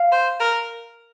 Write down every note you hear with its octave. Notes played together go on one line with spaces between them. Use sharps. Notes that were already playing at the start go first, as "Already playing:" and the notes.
Already playing: F5
C5
A#4